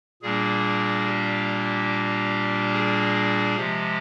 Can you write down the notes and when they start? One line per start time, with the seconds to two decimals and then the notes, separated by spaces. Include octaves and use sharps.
0.22 A#2 G3 A#3 D4 G#4
1.06 G4
2.73 G#4
3.56 C3 F3 G#3 G4